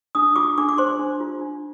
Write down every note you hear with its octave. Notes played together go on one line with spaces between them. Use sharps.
D4 D#6
F4 D6
D4 D6
D6
C5 C6
D4
F4
D4